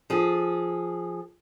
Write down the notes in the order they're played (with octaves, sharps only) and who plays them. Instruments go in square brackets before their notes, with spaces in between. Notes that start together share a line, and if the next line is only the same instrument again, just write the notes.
[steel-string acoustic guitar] F3 G#4 A4